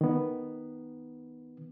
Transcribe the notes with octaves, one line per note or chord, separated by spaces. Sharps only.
D#3 B3